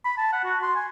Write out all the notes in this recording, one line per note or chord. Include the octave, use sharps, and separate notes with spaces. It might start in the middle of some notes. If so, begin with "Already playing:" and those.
B5
A5
F#5
F#4
C6
G#5